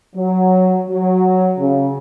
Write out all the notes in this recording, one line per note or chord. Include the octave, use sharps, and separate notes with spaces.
F#3
F#3
C#3